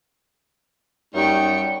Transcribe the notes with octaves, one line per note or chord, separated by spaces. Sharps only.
F#2 G3 D#4 G5 C#6